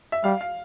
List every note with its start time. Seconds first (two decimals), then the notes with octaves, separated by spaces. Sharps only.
0.12 E5
0.24 G3 F5
0.41 F5